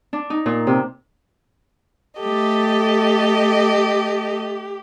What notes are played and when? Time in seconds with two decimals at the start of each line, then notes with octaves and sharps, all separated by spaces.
0.13 D4
0.30 D#4
0.46 A#2
0.67 C3
2.20 A3 G4 A4 D#5